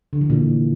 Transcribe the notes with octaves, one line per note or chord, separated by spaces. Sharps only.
D3
E3
A#2